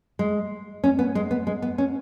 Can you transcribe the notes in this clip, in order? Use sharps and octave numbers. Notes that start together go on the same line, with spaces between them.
G#3
C#4
B3
G#3
B3
G#3
B3
C#4